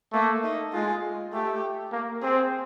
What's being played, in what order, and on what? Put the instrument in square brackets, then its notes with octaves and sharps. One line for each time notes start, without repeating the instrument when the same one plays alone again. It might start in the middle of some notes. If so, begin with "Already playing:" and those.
[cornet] A3 [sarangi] A#3
[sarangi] D#4
[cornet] G#3 [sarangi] F4
[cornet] A3 [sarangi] G4
[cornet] A#3
[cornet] C4 [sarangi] G#4